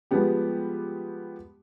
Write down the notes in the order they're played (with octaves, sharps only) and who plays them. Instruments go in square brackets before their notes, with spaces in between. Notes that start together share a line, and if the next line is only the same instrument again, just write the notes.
[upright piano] F3 G3 G#3 B3 G4